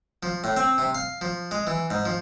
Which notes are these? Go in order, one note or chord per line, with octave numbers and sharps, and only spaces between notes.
F3
A2
C4
C3
F5
F3
G#3
E3
G#2
F3